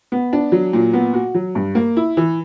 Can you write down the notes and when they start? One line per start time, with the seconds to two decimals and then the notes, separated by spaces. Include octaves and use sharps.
0.12 B3
0.33 D4
0.52 F#3
0.73 A#2
0.93 B3
1.14 F#4
1.35 F#3
1.55 G2
1.75 A#3
1.97 E4
2.17 E3